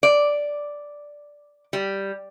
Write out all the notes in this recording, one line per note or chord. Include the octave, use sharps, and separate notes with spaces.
D5
G3